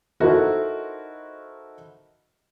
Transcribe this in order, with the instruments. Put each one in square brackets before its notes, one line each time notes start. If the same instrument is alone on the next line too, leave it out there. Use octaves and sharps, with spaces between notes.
[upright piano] D#4 E4 F#4 A4 A#4 C5